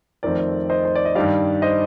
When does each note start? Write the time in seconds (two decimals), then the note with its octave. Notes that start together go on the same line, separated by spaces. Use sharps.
0.23 F2 D#3 A3 C4 A#4 D5
0.70 C5 D#5
0.85 C5
0.95 D5
1.05 D#5
1.15 G2 D#3 G3 D5 F5
1.62 C5 D#5